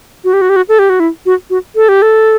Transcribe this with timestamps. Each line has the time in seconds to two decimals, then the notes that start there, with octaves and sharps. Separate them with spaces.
0.24 F#4
0.33 G4
0.41 F#4
0.49 G4
0.56 F#4
0.69 A4
0.79 G4
0.90 F#4
1.00 E4
1.26 F#4
1.50 F#4
1.76 A4
1.89 G4
2.02 A4